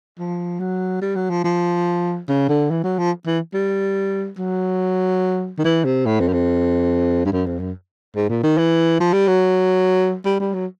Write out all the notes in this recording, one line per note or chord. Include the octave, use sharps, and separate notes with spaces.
F3
F#3
G3
F#3
F3
F3
C#3
D3
E3
F#3
F3
E3
G3
F#3
D#3
E3
C3
A2
F2
F#2
F2
G2
F#2
F2
F#2
G#2
A#2
D#3
E3
F3
G3
F#3
G3
G3
F#3